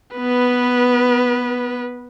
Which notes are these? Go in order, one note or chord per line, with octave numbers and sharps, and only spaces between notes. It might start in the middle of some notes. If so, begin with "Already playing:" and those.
B3 B4